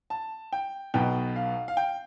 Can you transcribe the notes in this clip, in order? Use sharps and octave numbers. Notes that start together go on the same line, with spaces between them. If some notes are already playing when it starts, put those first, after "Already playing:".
A5
G5
B1 B2 B3 G5
F5
F5
G5